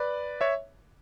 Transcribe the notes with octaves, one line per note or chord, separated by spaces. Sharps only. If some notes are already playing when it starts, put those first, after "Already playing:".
Already playing: B4 D5
C#5 E5